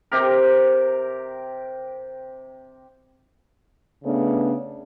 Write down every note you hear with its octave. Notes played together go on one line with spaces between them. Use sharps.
C3 G4 A#4
C#3 A3 B3 D4